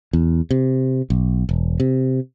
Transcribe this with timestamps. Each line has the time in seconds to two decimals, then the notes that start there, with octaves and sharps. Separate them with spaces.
0.13 E2
0.51 C3
1.10 B1
1.49 E1
1.80 C3